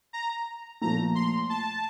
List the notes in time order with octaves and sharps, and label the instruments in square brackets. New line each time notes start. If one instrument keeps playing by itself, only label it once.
[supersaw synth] A#5
[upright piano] A#2 F3 A3 [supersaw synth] A#5
[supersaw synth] C6
A5